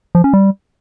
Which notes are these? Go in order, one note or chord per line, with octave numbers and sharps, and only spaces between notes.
F3
C#4
G3